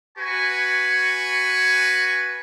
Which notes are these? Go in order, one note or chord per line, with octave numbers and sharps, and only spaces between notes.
F#4 B4 G#5 C#6